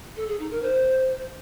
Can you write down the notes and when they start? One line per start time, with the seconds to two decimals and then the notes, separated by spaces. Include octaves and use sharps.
0.16 A4
0.28 G#4
0.39 D#4
0.51 A#4
0.62 C5